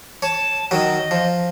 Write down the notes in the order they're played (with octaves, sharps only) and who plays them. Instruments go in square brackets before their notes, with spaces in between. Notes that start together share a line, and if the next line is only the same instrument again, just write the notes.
[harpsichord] C#5 [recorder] A5
[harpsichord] D#3 F#3 [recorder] D#5
[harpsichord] F3